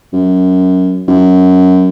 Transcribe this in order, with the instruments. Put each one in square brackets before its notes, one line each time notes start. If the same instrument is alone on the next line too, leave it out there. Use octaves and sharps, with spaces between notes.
[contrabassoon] F#2
F#2